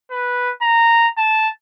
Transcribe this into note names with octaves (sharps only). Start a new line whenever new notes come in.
B4
A#5
A5